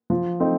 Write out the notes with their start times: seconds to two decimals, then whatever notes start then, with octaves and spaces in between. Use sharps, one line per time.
0.10 F3
0.40 A3 C4 D#4